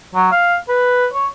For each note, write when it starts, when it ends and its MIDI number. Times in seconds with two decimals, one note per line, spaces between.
0.15 0.27 54
0.32 0.57 77
0.69 1.07 71
1.13 1.27 73